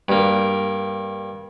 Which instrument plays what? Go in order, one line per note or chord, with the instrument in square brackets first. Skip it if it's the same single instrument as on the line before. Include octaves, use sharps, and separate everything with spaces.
[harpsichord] G2 A#3